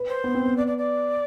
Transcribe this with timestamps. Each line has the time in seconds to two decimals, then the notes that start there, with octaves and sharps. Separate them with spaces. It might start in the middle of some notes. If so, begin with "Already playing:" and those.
Already playing: B4
0.09 C5
0.24 B3
0.35 C4
0.45 B3
0.57 D5
0.67 D5
0.78 D5